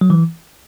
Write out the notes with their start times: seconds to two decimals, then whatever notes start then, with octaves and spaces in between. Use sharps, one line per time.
0.01 F#3
0.10 E3